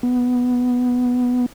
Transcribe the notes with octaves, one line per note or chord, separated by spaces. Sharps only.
B3